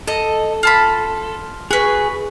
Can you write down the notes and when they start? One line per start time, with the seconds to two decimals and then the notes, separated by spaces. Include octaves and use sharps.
0.07 A4 D#5 A#5
0.63 F4 A5 B5
1.71 F#4 G#4 B4